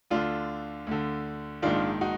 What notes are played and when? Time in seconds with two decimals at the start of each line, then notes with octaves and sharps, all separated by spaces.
0.11 D2 D3 D4 F4
0.87 D2 D3
1.62 A#1 G#2 D#3 D4 F4
2.01 D#4 F#4